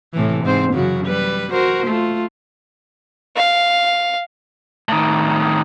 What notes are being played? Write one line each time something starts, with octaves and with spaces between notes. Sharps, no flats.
A2 C3 E3
G#2 C4 C5
F#2 C#3 F#4
G3 B4
F#4 A#4 C5
A3 F4
F5
A2 D#3